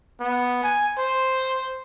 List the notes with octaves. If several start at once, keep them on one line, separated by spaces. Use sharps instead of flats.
B3
G#5
C5